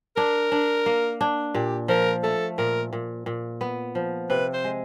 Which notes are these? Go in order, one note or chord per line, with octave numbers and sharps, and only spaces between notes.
D4 A#4
D4
A#3
D4
A#2 G4
F3 A#4
A3 A4
A#2 A#4
A#2
A#2
B3
F3
C3 B4
C5
G#3